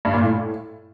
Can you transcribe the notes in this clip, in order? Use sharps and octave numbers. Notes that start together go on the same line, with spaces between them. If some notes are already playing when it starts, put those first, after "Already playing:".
G2
A#2
A2